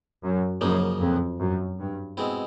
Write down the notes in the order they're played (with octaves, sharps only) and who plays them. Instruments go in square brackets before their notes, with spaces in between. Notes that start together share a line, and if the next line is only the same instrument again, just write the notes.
[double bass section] F#2
[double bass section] F#2 [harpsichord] C#3 F3 A#3 D#4
[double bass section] F2
F#2
G2
[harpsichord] B2 G#3 C4 E4